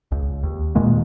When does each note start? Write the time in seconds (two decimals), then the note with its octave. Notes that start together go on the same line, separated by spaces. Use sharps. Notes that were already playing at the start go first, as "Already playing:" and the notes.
0.12 C#2
0.43 D#2
0.75 A#2 D#3 G#3 A#3